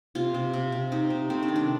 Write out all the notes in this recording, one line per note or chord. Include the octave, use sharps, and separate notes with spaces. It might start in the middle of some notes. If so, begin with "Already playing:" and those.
C3 F4
C3
C3
C3
C3 D#4
C3
A3 C4
D4
D#3
D4